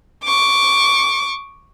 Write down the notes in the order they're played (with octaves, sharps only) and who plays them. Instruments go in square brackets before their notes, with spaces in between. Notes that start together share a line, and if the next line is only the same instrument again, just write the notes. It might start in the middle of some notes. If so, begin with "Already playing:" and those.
[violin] C#6 D6